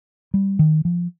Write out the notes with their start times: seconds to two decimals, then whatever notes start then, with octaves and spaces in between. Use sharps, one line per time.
0.34 G3
0.59 D#3
0.85 F3